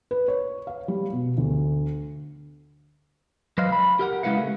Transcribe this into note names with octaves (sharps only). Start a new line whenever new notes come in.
B4
C#5
F5
G3
B2
D2
F#3 B4 C5 D#5 F5
B5
G4 A#4 F#5
C#3 G#3 E4 B4 F5 F#5
A3